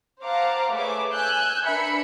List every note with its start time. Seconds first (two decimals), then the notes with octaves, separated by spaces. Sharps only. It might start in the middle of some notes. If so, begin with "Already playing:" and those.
0.24 C5 F5 F#5 A5 A#5 D6
0.72 A3 G#4 B4 C#5 E5 D6
1.11 G#5 E6 F#6 G6
1.65 D4 A#4 B4 E5 B5 C#7